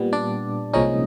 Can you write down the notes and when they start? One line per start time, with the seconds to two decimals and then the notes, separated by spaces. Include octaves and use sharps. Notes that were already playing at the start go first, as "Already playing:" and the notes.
Already playing: A#2 G3 B3
0.13 D4 D5
0.73 C2 A#2 F3 G#3 C#4 D#4 D#5